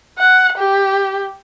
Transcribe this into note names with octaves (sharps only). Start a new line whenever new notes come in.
F#5
G4